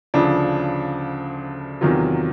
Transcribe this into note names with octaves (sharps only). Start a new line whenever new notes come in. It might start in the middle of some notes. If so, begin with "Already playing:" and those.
D2 C#3 F3 D4
E2 C3 D#3 F#3 F4